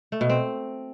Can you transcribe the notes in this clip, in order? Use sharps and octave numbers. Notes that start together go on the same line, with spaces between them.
A3
B2
C4